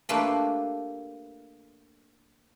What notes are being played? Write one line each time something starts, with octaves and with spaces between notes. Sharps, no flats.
A3 A#3 D4 F4 G4 B4